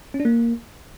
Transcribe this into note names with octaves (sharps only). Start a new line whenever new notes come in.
C#4
D4
A#3